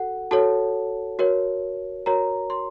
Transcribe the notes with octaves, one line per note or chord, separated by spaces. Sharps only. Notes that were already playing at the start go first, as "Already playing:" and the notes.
Already playing: F#4 A4 F#5
F#4 A4 C#5 A5
F#4 A#4 C#5
F#4 A#4 C#5 A#5
C6